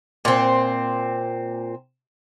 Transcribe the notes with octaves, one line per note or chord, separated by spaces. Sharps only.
A#2 C4